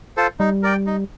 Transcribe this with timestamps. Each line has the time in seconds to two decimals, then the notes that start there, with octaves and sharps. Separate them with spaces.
0.17 F4 A4 C5
0.40 G3 D#4
0.63 A#4 D5 G5
0.86 D#4